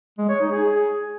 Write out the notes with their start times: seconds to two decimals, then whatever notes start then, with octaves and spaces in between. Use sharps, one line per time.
0.18 G#3
0.29 C#5
0.40 D#4
0.51 G#4